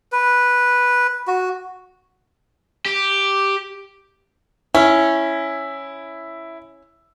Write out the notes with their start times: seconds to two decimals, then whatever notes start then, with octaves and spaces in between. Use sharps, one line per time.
0.12 B4
1.27 F#4
2.86 G4
4.75 C#4 E4